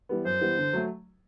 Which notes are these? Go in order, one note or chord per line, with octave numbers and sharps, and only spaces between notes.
E3 G3 B3
F#2 C5
E3 G3 B3
D3
F#3 A3